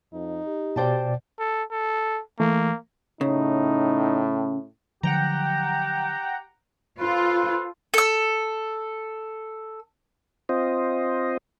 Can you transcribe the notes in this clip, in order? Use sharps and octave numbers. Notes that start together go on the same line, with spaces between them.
F2 D#4
G4
B2 C5 D5 G5 A5
A4
A4
E3 A3 A#3
A2 C#3 D#4
D3 F3 F#3 G4 F#5 G5 A#5
F4 A4 B4 C5
A4 E6
C4 F4 C5 D#5